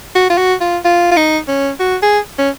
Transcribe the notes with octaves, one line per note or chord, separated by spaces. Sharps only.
F#4
F4
F#4
F4
F4
F4
D#4
C#4
F#4
G#4
C#4